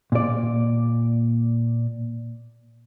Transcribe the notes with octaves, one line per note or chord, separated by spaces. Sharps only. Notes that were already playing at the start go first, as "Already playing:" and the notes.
A#2 D5